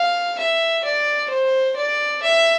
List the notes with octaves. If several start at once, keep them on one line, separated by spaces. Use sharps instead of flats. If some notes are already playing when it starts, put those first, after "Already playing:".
Already playing: F5
E5
D5
C5
D5
E5